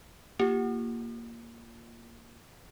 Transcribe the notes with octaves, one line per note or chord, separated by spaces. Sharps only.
A#3 F4 G4